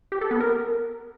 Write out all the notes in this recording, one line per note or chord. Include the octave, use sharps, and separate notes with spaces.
G4
A4
B3
A#4